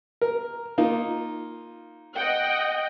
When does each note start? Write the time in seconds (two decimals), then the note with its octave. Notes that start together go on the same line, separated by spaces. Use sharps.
0.21 A#4
0.78 A#3 D#4 F4
2.14 D#5 F#5 G5